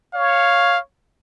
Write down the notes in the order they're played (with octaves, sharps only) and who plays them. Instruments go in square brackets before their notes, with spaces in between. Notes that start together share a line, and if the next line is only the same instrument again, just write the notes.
[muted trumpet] C#5 [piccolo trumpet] F5